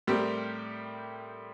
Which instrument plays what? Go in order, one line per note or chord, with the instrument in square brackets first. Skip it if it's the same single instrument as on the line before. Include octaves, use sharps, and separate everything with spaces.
[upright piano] A2 G3 C4 G4 A#4